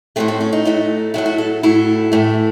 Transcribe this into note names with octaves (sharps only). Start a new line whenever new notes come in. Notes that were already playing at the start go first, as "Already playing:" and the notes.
A2 F#3 A3 C4
C4
C#4
D#4
A2 F#3 A3
A2 F#3 A3 E4
F#4
A4
A2 F#3 A3 E4
A2 E3 A3